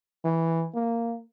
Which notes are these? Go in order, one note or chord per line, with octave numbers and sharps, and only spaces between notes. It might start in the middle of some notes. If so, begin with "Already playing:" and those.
E3
A#3